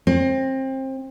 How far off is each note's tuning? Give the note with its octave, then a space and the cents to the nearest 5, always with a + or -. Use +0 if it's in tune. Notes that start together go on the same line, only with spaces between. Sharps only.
C4 +25